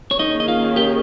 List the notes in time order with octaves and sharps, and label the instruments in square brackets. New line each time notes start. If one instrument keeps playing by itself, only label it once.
[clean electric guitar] C#5
[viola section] D#3 A#3 C#4 G#4 [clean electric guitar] D#4 D#5
[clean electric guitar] D#5
F4 F5
G4 G5